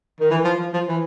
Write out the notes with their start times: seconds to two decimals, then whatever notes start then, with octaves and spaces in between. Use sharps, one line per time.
0.20 D#3
0.31 E3
0.44 F3
0.59 F3
0.73 F3
0.88 E3